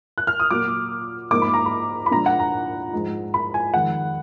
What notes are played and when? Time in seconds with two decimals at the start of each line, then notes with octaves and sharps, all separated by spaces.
0.18 F#6
0.27 F6
0.40 D#6
0.51 A#2 F#3 A#3 F4 D6
1.31 G#2 F3 A#3 D#4 D6
1.42 B5
1.54 A#5
1.66 B5
2.06 B5
2.11 A#2 F3 G#3 D4 A#5
2.26 F#5
2.39 A#5
2.93 G#2 F3 G#3 D#4
3.34 B5
3.54 G#5
3.73 F2 D#3 G#3 F#5